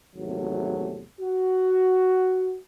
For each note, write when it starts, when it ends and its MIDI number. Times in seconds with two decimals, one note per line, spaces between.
0.15 1.04 32
0.15 1.04 40
0.15 1.04 48
0.15 1.04 54
0.15 1.04 57
1.21 2.58 66